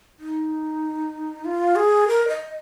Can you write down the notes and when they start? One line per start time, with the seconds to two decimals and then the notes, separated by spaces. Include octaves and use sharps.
0.19 D#4
1.45 F4
1.76 G#4
2.08 A#4
2.28 D#5